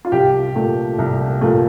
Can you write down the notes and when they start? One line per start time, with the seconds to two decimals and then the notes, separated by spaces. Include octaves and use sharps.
0.05 F4
0.12 C2 G4
0.55 A#2 A3
0.98 C2
1.41 A#2 A3